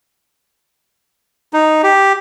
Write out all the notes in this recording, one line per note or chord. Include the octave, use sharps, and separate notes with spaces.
D#4
G4